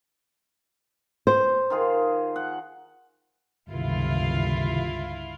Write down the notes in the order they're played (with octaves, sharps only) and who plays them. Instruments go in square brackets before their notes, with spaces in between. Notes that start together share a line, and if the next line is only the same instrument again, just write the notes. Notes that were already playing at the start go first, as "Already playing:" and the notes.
[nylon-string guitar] C5
[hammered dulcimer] D#3 F4 G#4
F#5
[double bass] G1 C#2 [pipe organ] C3 D#3 [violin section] E4 F4 F5